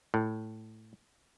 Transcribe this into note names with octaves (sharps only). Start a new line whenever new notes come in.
A2